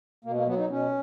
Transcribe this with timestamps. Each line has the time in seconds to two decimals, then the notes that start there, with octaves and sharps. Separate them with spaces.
0.24 B2 A#3
0.36 A#3
0.46 F#3 B3
0.58 D#4
0.69 B2 C#4